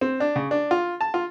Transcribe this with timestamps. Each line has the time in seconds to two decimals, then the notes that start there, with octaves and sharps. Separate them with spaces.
0.01 C4
0.20 D4
0.36 C#3
0.51 D4
0.71 F4
1.01 A5
1.14 F4